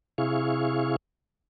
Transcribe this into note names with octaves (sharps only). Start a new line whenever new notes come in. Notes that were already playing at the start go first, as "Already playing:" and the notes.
C3 E4 G#4 F5 C#6